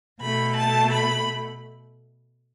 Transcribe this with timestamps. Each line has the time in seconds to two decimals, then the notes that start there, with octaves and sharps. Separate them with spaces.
0.21 B2 A3 B5
0.56 A5
0.91 B5